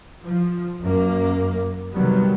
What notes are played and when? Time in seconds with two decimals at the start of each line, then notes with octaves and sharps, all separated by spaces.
0.23 F3
0.82 F#2 A#3
1.93 C3 D#3 F#3 G3 B3